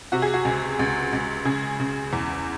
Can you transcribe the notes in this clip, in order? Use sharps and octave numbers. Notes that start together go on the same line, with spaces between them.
C3 F#4
G#4
F#4
C#2
C#2
C#2
C#3 G#4
C#3
E2